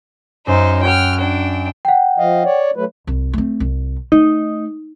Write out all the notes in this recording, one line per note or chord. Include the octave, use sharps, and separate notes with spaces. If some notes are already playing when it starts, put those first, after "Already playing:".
F#2 D#4 C5 F5
F#4 C#5 F#5 G5 F6
D4 G5
F#5 G5
F3 D#5 F5
C#5 D5
F#3 A3 B4
C2
A3 C4
C2
A3 D#4